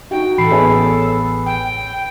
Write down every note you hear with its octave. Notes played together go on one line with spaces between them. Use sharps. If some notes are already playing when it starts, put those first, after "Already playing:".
D#4 F#4 G5
A1 A4 B5 C7
B3 G#4 C#5
G5